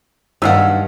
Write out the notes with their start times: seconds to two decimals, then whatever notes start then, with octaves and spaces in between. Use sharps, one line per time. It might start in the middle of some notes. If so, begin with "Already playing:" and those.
0.42 B1 G2 D#3 F5 F#5 E6